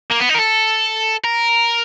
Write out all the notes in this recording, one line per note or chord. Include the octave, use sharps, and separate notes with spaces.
A#3
B3
D#4
A#4
A4
A#4